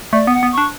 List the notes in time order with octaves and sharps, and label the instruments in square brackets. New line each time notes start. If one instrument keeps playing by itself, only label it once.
[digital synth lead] A3 [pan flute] D5
[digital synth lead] B3
[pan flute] F#5
[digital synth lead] B3
[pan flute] C#6
[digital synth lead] D4